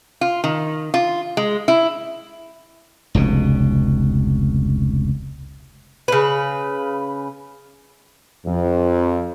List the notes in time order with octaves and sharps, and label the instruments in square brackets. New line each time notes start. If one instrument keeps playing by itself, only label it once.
[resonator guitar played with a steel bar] F4
D#3
F4
G#3
E4
[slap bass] F1 C#2 B2
[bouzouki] C#3 B4
[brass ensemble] F2